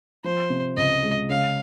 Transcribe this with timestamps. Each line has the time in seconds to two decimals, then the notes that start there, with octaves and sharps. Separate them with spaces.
0.24 F3 C5
0.50 C3
0.77 C#2 D#5
1.03 G#3
1.30 C#3 F5